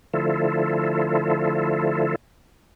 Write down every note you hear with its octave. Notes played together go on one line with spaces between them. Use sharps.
D3 F3 A3 E4 F4 A4